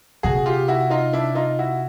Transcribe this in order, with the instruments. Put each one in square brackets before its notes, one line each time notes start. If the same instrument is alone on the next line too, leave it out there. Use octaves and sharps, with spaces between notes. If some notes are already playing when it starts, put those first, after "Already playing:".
[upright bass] C3 [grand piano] F#4 G#4
[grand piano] F4 G4
E4 F#4
D#4 F4
D4 E4
D#4 F4
E4 F#4